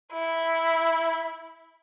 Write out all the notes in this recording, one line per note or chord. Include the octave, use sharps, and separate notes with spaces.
E4